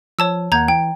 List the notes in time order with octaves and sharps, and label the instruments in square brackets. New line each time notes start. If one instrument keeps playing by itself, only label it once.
[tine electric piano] F3 [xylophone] C#5 A5 E6
[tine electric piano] D#2 A#3 F#5 [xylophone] A#5 G6 G#6
[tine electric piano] E3 [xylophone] G5